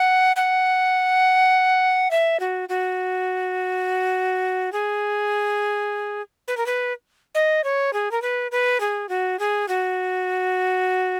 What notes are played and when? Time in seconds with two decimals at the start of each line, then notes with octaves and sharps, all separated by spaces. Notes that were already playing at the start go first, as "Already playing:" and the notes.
Already playing: F#5
0.36 F#5
2.11 E5
2.40 F#4
2.69 F#4
4.72 G#4
6.48 B4
6.57 A#4
6.66 B4
7.35 D#5
7.64 C#5
7.93 G#4
8.11 A#4
8.22 B4
8.51 B4
8.80 G#4
9.09 F#4
9.39 G#4
9.68 F#4